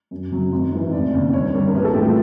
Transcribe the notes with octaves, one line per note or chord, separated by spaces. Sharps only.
F#2
C#3 F#3
G#1
G#2 E3
F1 D5
D#2 C#3
G2 C#5
D3 G3 A#3
A#4
A#1 B4
A4
A2 E3 A3 G4
F4